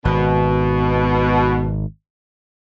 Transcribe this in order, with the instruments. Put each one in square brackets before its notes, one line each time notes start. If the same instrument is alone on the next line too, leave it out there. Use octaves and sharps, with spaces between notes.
[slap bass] G#1 [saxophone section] B2